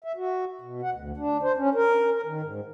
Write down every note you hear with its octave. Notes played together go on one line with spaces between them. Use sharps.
E5
F#4
B2
F#5
D2
D4
C5
C#4
A#4
A#4
D#3
G#2